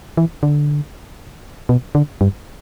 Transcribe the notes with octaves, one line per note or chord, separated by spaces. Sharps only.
E3
D3
B2
D3
G2